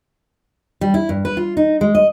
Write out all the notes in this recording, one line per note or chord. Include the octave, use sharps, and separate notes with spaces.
G3
E4
G2
B4
F4
D#4
G#3
D#5